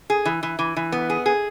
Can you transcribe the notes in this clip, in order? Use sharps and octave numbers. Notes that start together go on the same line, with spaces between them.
G#4
E3
E3
E3
E3
B3
G#4
G#4